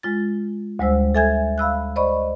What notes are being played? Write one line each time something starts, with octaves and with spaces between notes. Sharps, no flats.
G#3 F4 A6
D2 G3 G#3 C5 E6
A4 E5 G#5 G6 G#6
F5 B5 E6 F#6
C5 D5 D#5 B5 C#6